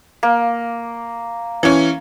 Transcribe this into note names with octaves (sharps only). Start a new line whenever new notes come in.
A#3
E3 C#4